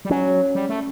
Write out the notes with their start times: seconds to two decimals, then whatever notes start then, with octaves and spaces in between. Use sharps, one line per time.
0.05 G3
0.10 F#3 C#4
0.55 G3
0.69 A3